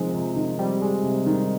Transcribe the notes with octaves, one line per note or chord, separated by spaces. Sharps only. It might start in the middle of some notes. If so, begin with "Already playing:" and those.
Already playing: C3 D#3 F3 G#3 C4
C3
D#3
G3 C4
G#3
C3
D#3